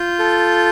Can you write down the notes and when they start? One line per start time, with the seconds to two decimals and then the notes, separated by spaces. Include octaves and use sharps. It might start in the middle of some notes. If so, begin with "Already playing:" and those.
Already playing: F4 G6
0.19 A4